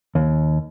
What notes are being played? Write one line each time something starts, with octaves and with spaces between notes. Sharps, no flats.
D#2